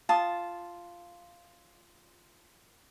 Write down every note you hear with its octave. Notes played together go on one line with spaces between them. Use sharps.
F4 A5 D#6